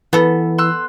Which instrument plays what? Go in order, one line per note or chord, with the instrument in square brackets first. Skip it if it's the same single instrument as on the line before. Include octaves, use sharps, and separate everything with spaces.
[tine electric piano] E3 [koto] B3 A4
[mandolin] C6 E6 F#6